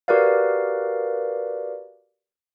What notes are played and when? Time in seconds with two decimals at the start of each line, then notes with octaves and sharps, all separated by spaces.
0.08 F#4 G4 A#4 B4 D5 F5